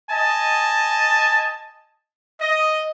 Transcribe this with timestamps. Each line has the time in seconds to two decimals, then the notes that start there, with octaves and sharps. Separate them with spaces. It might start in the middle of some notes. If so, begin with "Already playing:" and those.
0.10 D#5 G#5 A5
2.41 D#5